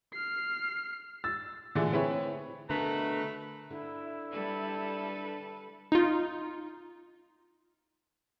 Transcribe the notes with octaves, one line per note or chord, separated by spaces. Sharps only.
F6 C7
E6 A6
A#2 D3 E3 A3 D4 G#4
C4 E4 G#4 B4 C#5
B2 D3 A3 A#4 B4
D3 E4
G3 A4 B4
D#4 F4